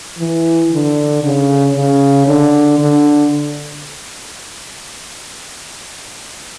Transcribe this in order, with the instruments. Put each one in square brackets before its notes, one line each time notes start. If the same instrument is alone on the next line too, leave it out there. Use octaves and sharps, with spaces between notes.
[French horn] E3
D3
C#3
C#3
D3
D3